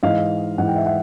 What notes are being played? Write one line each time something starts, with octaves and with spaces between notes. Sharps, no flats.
G#2 E3 D#5 F5
G#2 E3 F#5
G5
E5 F#5
E5 F#5